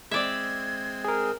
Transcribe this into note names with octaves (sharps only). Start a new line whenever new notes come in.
G#3 C4 D5 E5 G#6
G#4 A#4